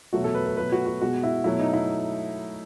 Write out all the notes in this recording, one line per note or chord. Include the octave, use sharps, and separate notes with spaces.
E2 B2 F#3 A3 F#4
A4
B4
B4
B2 F#3 A3 B4
F#4
F#4
B2 G#3 F#4
E4
B2 F#3 A3 E4
D#4
E4